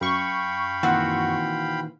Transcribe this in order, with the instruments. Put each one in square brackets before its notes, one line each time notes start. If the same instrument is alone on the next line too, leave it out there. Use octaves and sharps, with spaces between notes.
[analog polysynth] F#2 C#6 [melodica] F5 G5 B5
[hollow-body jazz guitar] A#2 D#3 E3 [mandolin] C4 F#4